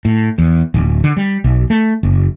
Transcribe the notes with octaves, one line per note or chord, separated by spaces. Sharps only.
A2
E2
D1
D3
G3
B1
A3
F#1